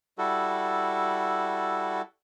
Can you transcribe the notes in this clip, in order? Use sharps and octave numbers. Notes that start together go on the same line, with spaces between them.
G3 E4 F#4 A4